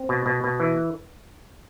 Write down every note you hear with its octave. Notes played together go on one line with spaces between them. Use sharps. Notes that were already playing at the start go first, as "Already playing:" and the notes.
Already playing: C4
B2
B2
B2
E3